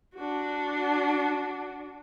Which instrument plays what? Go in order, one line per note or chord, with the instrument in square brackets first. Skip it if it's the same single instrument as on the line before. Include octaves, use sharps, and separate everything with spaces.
[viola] D4 F#4